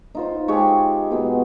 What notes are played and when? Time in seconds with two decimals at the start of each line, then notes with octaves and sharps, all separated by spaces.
0.15 D#4 F4 C5
0.48 G#3 G4 C#6
1.10 B2 G#3 B3